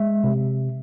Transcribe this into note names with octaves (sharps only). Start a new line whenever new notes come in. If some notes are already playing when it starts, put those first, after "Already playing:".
Already playing: G#3 E5
C3